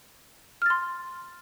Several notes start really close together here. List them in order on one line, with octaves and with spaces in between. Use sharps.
F6 A6 C6